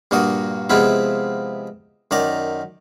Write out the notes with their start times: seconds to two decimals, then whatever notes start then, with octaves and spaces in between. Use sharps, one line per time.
0.11 G2 A#2 A#3 F#4 D#6
0.70 C3 F3 G#3 B3 E4 F4
2.11 F#2 D#3 D5 A#5